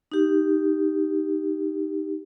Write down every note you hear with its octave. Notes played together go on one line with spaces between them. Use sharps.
D#4 G4